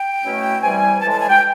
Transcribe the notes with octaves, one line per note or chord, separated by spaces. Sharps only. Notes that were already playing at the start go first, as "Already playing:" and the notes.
Already playing: G5
B2 F#3 A3 C#4 E4
C3 E3 G3 G#5
A2 E3 G#3 A5
A5
G#5
G5